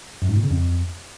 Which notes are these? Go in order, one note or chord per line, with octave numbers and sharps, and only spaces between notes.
F#2
G#2
A#2
C#3
F2